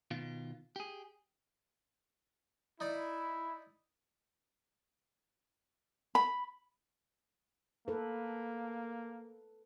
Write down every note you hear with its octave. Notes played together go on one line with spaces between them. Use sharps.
B2 D#3 F4
G4 G#4
D#4 E4 D5
B5
A#3 A4 B4